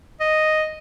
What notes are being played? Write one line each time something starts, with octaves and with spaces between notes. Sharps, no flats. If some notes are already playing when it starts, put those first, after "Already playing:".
D#5